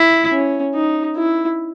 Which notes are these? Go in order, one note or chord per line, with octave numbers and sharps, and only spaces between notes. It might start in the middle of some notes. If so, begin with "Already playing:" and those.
Already playing: E4
C#4
D#4
E4